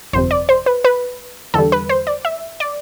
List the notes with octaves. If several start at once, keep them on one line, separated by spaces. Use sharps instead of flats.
G1 F2 C3 C5
D5
C5
B4
B4
E2 D3 G3 A4
B4
C5
D5
E5
D5